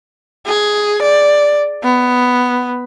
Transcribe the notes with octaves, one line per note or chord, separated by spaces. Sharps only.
G#4
D5
B3